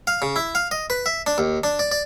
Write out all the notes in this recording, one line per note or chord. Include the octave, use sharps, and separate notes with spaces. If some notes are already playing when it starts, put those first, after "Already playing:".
F5
C#3
E4
F5
D#5
B4
E5
D4
D#2
D4
D5
D5